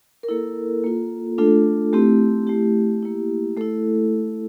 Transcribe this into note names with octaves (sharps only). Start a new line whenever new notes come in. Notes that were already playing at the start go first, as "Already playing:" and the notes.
A#4
A#3 E4 A4
A#3 F4
A3 D4 F4 A4
A3 C4 E4 G4
A3 E4 G4
A#3 E4
A3 E4 A4